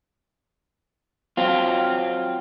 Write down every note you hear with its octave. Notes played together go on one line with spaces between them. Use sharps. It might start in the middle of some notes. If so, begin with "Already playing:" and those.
F#3 C4 F4